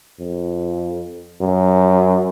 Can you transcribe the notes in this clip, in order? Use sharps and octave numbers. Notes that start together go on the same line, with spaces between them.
F2
F#2